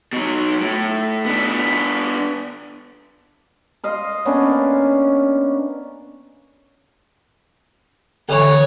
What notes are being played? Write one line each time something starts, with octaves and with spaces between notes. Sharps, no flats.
B2 F#3
A2
B3 D4
D#5 F5 C6
A#3 B3 C#4 D4
D2 E3 C#5